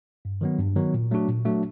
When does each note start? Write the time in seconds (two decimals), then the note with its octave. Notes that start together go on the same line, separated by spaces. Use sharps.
0.25 G2
0.41 D#3 F#3 B3
0.59 G2
0.76 D#3 F#3 B3
0.94 A#2
1.11 F#3 A3 D4 F#4
1.28 A#2
1.45 F#3 A3 D4 F#4